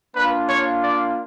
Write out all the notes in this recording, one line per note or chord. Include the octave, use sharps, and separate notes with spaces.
A#3 D4 F4 B4
C#5
D5